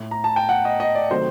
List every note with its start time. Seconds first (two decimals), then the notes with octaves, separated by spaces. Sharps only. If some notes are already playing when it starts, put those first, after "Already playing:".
Already playing: A2 A3
0.11 A#5
0.24 A5
0.36 G5
0.49 F#5
0.65 D#5
0.80 D#5
0.95 D5
1.10 C3 D#3 F#3 A3 C5